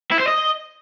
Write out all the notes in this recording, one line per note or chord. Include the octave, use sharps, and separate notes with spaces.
E4
C5
D#5